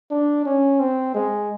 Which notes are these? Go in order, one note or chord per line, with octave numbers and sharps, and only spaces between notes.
D4
C#4
C4
G#3